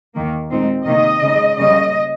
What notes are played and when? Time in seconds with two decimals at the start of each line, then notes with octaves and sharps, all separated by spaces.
0.14 D#2 D#3 A#3
0.51 A#2 G#3 C4 D#4
0.86 C3 D#3 A#3 D#4 D#5
1.22 C#3 G#3 D#4
1.59 C#3 G3 A#3 C#4 D#5